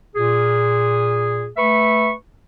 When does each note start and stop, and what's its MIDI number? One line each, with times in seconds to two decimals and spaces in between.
0.16 1.47 46
0.16 1.47 68
1.56 2.11 57
1.56 2.11 71
1.56 2.11 76
1.56 2.11 85